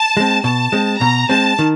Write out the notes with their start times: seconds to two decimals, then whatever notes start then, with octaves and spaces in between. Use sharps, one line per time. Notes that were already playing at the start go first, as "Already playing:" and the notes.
Already playing: A5
0.17 G#3 C4
0.44 B2 A5
0.72 G#3 C4
1.01 B2 A#5
1.29 G#3 C4 A5
1.59 D#3